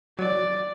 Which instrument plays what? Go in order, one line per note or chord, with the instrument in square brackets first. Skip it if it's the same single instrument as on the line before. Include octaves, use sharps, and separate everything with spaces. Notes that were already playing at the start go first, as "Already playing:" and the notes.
[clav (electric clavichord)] F#3 [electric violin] D5